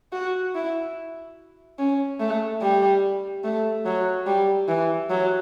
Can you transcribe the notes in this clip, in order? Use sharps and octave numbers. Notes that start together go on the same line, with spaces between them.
F#4
E4
C#4
A3
G3
A3
F#3
G3
E3
F#3